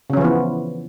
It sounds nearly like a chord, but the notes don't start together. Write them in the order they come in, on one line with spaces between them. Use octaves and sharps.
C#3 C#4 F3 E3 B3